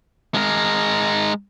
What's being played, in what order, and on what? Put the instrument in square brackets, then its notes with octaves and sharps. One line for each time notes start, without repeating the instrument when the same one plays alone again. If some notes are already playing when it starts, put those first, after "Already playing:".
[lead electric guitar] G#3 A#4